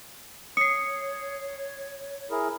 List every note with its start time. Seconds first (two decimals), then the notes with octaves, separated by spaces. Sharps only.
0.57 C#5 D#6 C7 C#7
2.31 E4 G#4 A#4